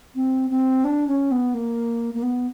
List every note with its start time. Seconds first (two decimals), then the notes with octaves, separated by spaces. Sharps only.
0.15 C4
0.50 C4
0.84 D4
1.08 C#4
1.31 B3
1.54 A#3
2.14 A#3
2.23 B3